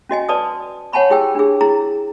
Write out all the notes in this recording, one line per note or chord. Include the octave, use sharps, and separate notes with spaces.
C#4 F#4 D#5 G#5
B4 D5 A5 C6 D#6
C#5 F#5 G#5 A5 B5 C#6
E4 G4 G#4 G5 G#5 E6
D4 G#4
E4 G#4 A#5